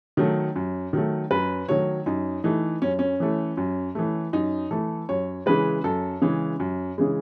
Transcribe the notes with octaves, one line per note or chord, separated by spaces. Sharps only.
D#3 F#3 A3
F#2
D#3 F#3 A3
F#2 B4
D#3 F#3 A3 C#5
F#2 D#4
E3 A3 D#4
F#2 C#4
C#4
E3 A3
F#2
E3 A3
F#2 D#4
E3 A3 A4
F#2 C#5
C#3 E3 G#3 B4
F#2 A4
C#3 E3 G#3
F#2
C#3 E3 G#3